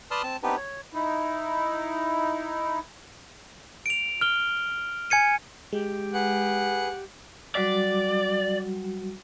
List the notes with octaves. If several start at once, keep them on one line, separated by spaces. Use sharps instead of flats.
B4 D5 A5 C6 D#6 F6
C4 A5
B3 C4 D4 D#4 G4 B4
C#5
D#4 E4
D7 F7
F6 G7
G#5 G#6 C#7 D#7
G#3 G4
G#4 B4 F#5
F#3 G3 F#4 D5